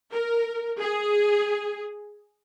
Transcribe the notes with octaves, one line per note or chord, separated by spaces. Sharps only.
A#4
G#4